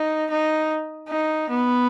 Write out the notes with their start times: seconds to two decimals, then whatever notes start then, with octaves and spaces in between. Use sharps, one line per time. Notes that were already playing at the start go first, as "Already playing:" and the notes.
Already playing: D#4
0.31 D#4
1.09 D#4
1.50 B3